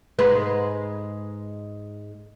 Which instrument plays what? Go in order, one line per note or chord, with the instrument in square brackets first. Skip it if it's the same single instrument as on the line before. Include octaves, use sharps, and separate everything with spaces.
[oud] G#2 G#3 B4